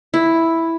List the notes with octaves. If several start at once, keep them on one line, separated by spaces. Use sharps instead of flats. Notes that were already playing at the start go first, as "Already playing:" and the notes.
E4